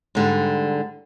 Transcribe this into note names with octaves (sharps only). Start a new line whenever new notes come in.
G#2 D3 G3